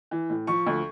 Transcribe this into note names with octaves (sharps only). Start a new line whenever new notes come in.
E3
A2
F3 C#6
D2